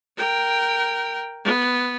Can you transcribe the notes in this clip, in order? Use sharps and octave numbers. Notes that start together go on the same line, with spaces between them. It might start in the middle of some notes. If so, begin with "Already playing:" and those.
A#4 G5
B3